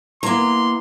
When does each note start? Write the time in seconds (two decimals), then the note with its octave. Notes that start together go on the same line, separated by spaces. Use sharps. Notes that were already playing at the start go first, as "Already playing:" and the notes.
0.23 A#3 B3 E4 A#5 C6